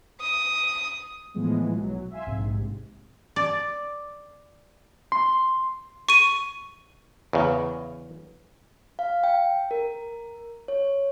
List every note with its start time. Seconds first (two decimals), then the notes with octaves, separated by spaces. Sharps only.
0.20 D#6
1.34 A2 E3 F3 G#3 B3
1.75 B1 F#3
2.11 E5 F5 G#5 C6
2.26 A#1 G#2 C3
3.36 D5
5.12 C6
6.09 C#6 D#7
7.33 E2 C#3
8.99 F5
9.24 G5
9.71 A#4
10.68 C#5